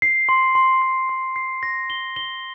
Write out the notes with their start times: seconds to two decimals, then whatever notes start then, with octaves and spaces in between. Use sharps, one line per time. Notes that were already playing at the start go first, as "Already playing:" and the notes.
0.02 C7
0.29 C6
0.55 C6
0.82 C6
1.09 C6
1.36 C7
1.63 A#6
1.90 G7
2.16 G7